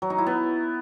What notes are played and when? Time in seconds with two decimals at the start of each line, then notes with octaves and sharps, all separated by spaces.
0.02 F#3
0.10 D#4
0.18 E4
0.27 B3